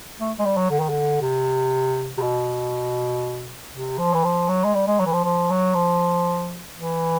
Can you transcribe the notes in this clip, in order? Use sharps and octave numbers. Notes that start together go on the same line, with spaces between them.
A3
G#3
G3
F#3
D3
D#3
D3
C3
C3
B2
C3
F3
E3
F3
F#3
G#3
G3
G#3
F#3
E3
F3
F3
F#3
F3
E3